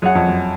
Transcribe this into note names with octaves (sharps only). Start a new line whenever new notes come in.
F#2 G#4 C#5 F#5
F2
F#2